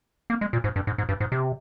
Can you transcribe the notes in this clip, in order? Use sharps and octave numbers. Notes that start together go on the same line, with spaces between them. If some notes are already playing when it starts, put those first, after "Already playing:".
A#3
G#3
A#2
G#2
G2
G#2
G#2
G2
G#2
C3